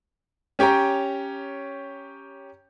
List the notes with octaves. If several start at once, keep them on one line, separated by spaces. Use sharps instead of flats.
C#4 G4 C#5 G5 A#5